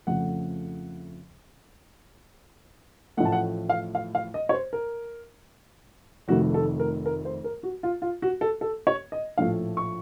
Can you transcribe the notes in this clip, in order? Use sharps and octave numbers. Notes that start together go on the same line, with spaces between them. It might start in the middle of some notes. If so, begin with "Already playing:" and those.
F2 C#3 F3 A3 F#5
A1 A2 F3 A3 F#5
A5
F#5
F5
F5
F5
D#5
C#5
C5
A#4
F1 F2 D#3 A3 F#4
A4
A#4
A#4
C5
A#4
F#4
F4
F4
F#4
A4
A4
C#5
D#5
A#1 A2 F3 A3 F5
C#6